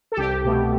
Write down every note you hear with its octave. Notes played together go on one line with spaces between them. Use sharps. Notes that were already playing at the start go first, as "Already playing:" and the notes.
A4
C2 G4
B2 A3